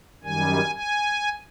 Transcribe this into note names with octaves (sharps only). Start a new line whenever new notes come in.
F#2 D#3 G3 G#5
G#5